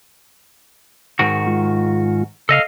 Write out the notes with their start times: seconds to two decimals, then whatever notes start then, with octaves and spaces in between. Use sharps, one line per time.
1.19 G#2 D#3 F#4
1.47 G#3 F4
2.49 C#3 A4 D#5 F5